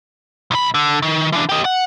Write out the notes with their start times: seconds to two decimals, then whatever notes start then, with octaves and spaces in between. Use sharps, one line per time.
0.51 B1 B5
0.74 D3
1.02 D#3
1.32 E3 D4
1.49 G4 D#5
1.65 F#5